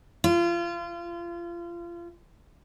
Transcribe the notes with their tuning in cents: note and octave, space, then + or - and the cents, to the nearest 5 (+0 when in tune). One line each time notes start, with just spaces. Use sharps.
F4 -30